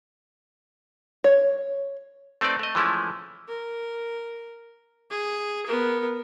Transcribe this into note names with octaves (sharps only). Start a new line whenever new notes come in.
C#5
A3 C4 D#4 B4 D5
A3 D#5
E3 F3 G#3 A3 C#4 E4
A#4
G#4
B3 A#4